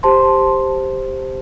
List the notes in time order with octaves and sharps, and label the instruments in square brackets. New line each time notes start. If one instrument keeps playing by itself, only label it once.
[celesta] G4 C5 A5 C6